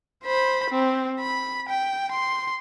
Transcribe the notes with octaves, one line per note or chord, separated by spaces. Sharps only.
C5 B5
C4
B5
G5
C6